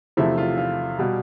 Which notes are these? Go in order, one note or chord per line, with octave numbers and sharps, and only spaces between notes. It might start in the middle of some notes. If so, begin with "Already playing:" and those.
E2 C3 F3 A3 E4
F4
F4
B2 G3